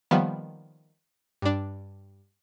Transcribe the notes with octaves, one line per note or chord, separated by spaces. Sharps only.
D#3 F3 G3 A#3 B3
G2 D4